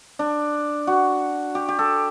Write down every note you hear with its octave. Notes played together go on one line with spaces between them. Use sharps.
D4
F#4
G4
G4
A4